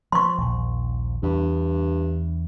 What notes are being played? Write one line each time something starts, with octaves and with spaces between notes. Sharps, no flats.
F3 C6 C#6
A#1 D#2
E2 G2